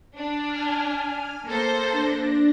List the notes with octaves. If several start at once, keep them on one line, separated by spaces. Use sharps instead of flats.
D4
G#5 F6
A#3 A4 C5
D4 A#6